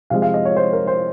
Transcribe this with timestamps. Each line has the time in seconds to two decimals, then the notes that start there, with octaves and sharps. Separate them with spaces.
0.10 C3 F3 G#3 F5
0.22 F5
0.34 D#5
0.45 C#5
0.56 C5
0.73 A#4
0.87 C5